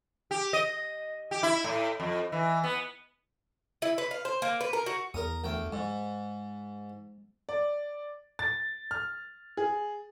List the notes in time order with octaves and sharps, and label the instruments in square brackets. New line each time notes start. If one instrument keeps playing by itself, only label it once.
[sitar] G4
D#5
G4
E4
A2
F2
E3
B3
[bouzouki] E4
B4
F5
C5
A#3
B4
A#4
F#4
[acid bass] E2 [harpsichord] A#4 D#6
[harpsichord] D2 G5
[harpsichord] G#2 [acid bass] G#3
[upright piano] D5
A6
F6
G#4